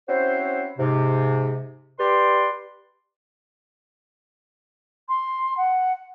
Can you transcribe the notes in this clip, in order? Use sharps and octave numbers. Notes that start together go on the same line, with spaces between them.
C4 C#4 E4 F#4 C5
G#2 C3
G4 B4 D5 C6
C6
F#5